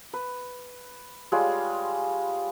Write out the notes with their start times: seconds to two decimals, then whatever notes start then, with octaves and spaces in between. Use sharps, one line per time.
0.14 B4
1.32 G3 G#3 F4 C#5